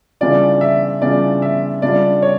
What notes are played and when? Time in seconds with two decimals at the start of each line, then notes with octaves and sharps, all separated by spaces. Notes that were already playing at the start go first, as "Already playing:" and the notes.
0.21 C#3 E3 G3 D4 F4 D5
0.61 E5
1.01 C#3 E3 G3 D4 F4 D5
1.42 E5
1.82 C#3 G3 D4 F4 D5
2.22 C#5